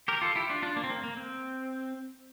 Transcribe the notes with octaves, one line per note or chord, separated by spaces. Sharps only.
G4 A#4
F4 A4
E4 G4
D4 F4
D4 F4
A#3 D4
C4
A#3
A#3
C4